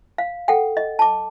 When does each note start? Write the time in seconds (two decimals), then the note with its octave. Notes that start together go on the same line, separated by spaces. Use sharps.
0.18 F5
0.48 A4 F#5 G5
0.77 D#5
0.99 A5 D6